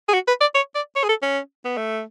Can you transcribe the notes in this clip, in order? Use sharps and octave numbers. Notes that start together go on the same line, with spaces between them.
G#4
F#4
B4
D5
C#5
D5
C#5
G#4
A4
C#4
B3
A3